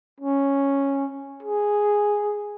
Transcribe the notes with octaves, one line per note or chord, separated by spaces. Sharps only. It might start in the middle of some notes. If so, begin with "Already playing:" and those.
C#4
G#4